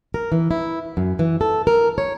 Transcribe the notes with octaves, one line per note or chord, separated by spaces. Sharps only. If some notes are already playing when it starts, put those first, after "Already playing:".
A#4
E3
E4
F#2
E3
A4
A#4
C#5